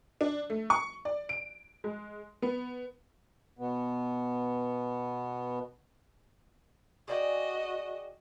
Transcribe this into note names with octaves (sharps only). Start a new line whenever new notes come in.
D4
A3
C#6
D5
D7
G#3
B3
B2 B3
F#4 G#4 D5 D#5 G5